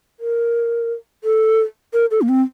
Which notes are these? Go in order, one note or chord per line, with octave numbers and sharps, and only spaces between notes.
A#4
A4
A#4
A4
A#3
C4